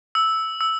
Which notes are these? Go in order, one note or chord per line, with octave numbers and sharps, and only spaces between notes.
E6
E6